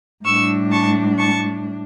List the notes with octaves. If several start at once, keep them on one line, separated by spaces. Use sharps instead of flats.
A2 G3 D4 C#6 E6
A5 C#6
A5 C#6